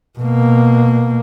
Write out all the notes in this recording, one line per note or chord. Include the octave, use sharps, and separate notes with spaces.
B2 A#3